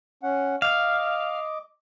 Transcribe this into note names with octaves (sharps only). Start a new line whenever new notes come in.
C#4 F#5
D#5 F5 D6